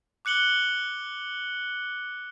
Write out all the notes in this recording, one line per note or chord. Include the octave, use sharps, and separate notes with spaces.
D6 F#6 C#7 F#7 G7